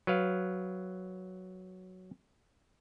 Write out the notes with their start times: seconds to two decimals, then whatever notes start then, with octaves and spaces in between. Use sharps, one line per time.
0.07 F#3 B4 F5